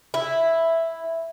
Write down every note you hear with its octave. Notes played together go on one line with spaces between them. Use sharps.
E4